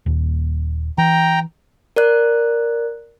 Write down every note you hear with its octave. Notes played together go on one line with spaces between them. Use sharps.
D#1 D#2
E3 G5 A#5
A#4 D5 F#6